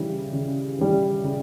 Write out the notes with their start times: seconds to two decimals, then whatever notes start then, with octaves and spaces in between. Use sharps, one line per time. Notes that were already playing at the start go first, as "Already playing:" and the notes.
Already playing: C#3 E3 G3
0.32 C#3
0.79 E3 G3
1.24 C#3